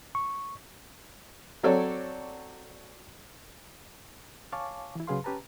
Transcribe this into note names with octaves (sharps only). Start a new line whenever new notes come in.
C#6
F#3 C4 A4 C#5 D5
C#5 F5 G#5 A5 C#6 D6
E3 E4
C#3 F#3 G#4 B4 F5 C6
C#4 G4 B4 A5 A#5